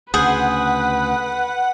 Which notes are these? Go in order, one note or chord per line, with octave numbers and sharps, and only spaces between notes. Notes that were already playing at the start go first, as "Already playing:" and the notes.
D2 C#3 G#4 B4 C5 F#5